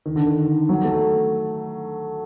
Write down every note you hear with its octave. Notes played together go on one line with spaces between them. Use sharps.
D#3
D3
D#3
F#3
A3